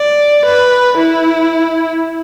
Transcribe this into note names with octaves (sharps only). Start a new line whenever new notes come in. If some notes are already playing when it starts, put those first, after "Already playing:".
Already playing: D5
B4
E4